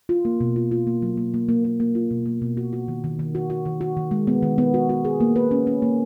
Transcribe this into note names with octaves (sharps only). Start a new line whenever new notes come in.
F4
A#3
B2
F4
F4
A#3
F#3
A#3
A#3
A#3
A#3
A#3
F4
B2
A#3
B2
F#4
F#4
D#3
D#3
D#3
F#4
F#4
D#3
F#4
D#3
G#3
B3
D#3
B3
F#4
F#4
G#4
A#3
B4
C#4
C#4
A#3